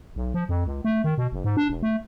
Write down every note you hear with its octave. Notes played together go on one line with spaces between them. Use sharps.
B1
F3
F2
C#2
A3
D#3
B2
F#1
G#2
D4
E1
A3